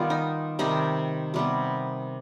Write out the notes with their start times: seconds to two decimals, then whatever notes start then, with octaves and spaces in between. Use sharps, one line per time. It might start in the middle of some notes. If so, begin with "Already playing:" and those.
Already playing: D#3 G3 B3 F4
0.10 D#4
0.59 C3 D#3 G3 D#4
1.34 C3 G3 B3